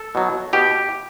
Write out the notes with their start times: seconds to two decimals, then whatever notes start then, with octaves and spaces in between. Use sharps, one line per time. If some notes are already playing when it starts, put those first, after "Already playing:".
Already playing: A4
0.15 B2 F#3
0.53 B2 G4